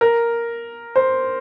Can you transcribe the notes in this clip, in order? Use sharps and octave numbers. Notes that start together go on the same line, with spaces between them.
A#4
C5